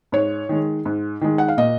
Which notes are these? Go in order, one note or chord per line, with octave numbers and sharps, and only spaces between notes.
G#2 C#5
D#3 G#3
G#2
D#3 G#3
F#5
F5
A#2 D#5